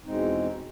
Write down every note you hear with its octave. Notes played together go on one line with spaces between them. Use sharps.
E2 B2 G#3 C4 D#4